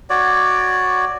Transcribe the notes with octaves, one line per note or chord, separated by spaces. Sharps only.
F#4 C#5 D5